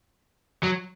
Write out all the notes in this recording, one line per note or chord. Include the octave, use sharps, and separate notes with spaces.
F#3